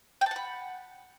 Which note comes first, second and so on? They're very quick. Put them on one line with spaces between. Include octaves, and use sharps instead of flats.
G5 A5 F#5 B5